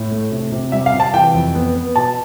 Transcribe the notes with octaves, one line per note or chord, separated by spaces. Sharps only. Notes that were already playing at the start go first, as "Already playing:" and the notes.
Already playing: A2
A3
C3
C3
G3 E5
F5
C3
A5
E3 G5
F2
B3
B3
B2 A5